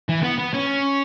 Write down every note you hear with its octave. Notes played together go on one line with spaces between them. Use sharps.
E3
B3
B3
C#4